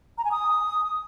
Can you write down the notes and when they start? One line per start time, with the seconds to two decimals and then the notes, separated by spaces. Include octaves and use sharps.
0.18 A#5
0.25 G#5
0.31 D#6